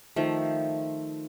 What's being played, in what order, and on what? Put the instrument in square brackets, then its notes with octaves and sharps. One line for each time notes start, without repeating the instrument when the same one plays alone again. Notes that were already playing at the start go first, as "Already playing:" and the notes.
[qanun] D#3 F3 A3